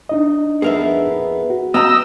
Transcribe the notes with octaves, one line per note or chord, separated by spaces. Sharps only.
D4 D#4 D#5
F2 B3 G#4 A#4 E5
F#4
B3 D#5 F5 G5 A#5 E6